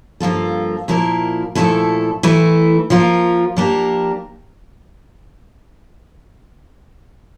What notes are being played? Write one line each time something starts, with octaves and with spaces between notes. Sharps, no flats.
G2 F3 A#3 F4 A4
A#2 F3 A#3 E4 A#4
A#2 F3 A3 E4 A4
E3 A3 E4
F3 A#3 F4 A#4
F3 A#3 D4 G4 A#4